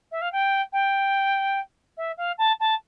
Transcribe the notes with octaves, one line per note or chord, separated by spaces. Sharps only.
E5
F5
G5
G5
E5
F5
A5
A5